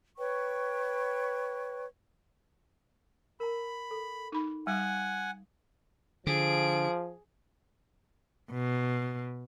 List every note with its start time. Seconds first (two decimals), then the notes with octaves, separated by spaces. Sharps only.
0.17 B4 C#5 G5 C#6
3.40 A#4 A#5 B5
3.91 A4
4.32 D#4 B5
4.67 G3 F5 F#5 G#5 D#6
6.27 D3 F3 G#4 D7
8.52 B2